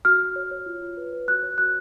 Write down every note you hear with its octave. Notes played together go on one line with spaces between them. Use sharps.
F#4 F6
F#4
C#5
C#5
F4
F4
B4
B4
F#4 F#6
C#5
F#4 F#6